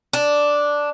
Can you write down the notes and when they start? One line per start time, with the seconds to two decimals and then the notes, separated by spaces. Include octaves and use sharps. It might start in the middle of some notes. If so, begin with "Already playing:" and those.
0.13 D4